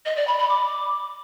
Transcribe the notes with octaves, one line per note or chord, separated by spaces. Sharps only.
D#5
D5
B5
B5
D6